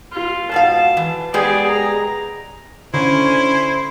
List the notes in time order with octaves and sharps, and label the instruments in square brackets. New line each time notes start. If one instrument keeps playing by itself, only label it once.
[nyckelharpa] F4
[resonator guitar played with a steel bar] G#2 B2 F5 [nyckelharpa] A5
[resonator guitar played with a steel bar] E3
[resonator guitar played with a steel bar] G#3 B3 G4 [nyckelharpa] G#4 D5
[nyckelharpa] A#5
[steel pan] D3 [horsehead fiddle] C#4 [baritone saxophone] E4 [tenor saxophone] C5